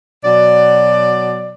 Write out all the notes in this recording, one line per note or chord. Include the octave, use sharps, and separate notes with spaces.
B2 F#3 D5